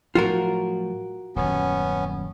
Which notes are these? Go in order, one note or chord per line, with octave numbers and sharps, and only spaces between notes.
A2 F3 F#3 F4 F#4 A#4
D#1 F#2 B3 C#4